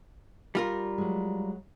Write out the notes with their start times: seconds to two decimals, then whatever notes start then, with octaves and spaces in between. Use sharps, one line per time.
0.55 G3 F4 A#4
0.98 F#3 G#3